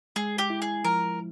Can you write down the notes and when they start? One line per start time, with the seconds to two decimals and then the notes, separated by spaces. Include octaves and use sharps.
0.16 G#3 G#4
0.38 G4
0.50 E4
0.62 G#4
0.84 F3 A#4